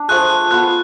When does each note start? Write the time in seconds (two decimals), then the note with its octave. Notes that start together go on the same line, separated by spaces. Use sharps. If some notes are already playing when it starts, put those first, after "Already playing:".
Already playing: D4
0.08 F3 A3 F4 G#4 F#6
0.51 B3 F4 A4 F#6